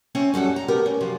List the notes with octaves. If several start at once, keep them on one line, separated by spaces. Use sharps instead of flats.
C4 C#4 C#5 E5
F#2 G3 A4 F#5
A#5
A3 B3 G4 A#4
C#4
F#2 C3 F3 F4